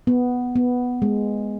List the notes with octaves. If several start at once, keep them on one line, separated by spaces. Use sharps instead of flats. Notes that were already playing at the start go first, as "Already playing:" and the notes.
B3
B3
G#3